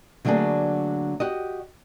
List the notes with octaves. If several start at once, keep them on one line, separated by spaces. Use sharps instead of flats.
D3 F#3 A3 A#3 D4 G#4
F#4 G4 D#5